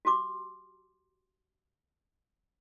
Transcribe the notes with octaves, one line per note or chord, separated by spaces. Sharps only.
F#4 G4 C6 D6